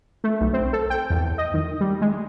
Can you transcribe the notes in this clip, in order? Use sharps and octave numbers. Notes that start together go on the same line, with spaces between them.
A3
B1
C4
A4
G5
E2
D#5
D#3
G3
G#3